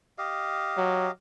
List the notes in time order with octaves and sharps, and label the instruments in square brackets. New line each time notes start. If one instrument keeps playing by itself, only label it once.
[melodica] G4 D#5 F5
[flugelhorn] F#3